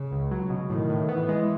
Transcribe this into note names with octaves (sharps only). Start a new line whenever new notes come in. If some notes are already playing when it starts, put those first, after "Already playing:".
Already playing: C#3
C#2
F#3
B2
A2 D#3
A2
E3 B3
G#3